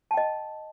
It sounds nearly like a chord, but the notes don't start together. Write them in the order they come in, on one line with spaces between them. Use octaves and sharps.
A5 G5 D#5